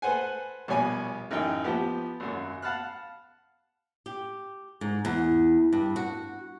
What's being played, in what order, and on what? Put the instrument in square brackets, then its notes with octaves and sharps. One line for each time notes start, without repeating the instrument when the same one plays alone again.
[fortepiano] A4 B4 C5 F#5 G#5
A#1 B2 G3 C#5 G#5
A1 F#2 D#4 G5
F3 B3 G4
G#1 F#2
F5 F#5 A5 B5 F6 F#6
[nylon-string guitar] G4
G#2
E2
G2
F#4